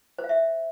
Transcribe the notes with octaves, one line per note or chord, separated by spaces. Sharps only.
C5
F5
E5